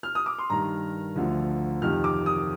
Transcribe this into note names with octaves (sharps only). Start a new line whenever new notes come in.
F6
D#6
D6
C6
G2 D#3 A#5
D2 D3 F3
F2 C3 D#3 F6
D6
D#6